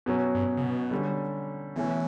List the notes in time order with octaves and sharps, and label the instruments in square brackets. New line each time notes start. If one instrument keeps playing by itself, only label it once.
[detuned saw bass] F#2 [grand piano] B2 F#3 C#4
[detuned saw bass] G2
C#3
B2
[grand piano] D3 G3 C#4
[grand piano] B2 A3 C#4 [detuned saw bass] E3